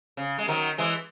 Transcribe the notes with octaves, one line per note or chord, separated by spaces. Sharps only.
C#3
G#3
D#3 F#3
E3 G#3